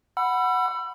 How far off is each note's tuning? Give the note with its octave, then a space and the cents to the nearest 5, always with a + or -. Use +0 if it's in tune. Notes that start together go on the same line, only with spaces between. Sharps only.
F#5 +0 B5 +0 E6 +35